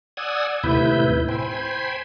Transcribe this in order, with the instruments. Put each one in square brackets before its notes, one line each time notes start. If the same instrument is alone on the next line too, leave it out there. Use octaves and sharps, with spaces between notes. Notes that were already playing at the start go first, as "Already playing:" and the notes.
[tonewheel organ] D5 F#5 G#5 D#6 E6
D#2 A2 C3 E4 B4 G6
C5 G5 G#5 B5